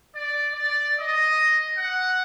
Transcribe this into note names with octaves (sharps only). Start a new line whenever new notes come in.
D5
D5
D#5
F#5